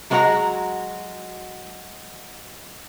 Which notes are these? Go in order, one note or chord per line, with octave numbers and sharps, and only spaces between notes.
F#3 G#3 F#4 B4 F#5 A#5